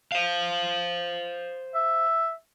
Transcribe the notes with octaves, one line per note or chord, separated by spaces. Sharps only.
C5 F5
E5